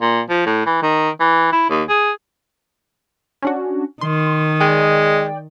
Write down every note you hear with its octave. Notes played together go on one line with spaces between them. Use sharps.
A#2
F3
A2
E3
D#3
E3
E4
D#2
G#4
C#4 D4 F#4
D#3 C6
G#3 D5 G5